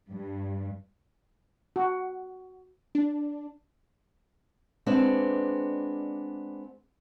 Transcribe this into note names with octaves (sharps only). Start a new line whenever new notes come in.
G2
F#4
D4
G#3 B3 C4 D4 D5